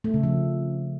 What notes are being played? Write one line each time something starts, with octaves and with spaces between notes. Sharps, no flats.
A3
C#3
F3